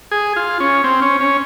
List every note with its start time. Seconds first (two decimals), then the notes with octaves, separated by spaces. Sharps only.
0.11 G#4
0.36 F4
0.60 C#4
0.84 C4
1.02 C#4
1.21 C#4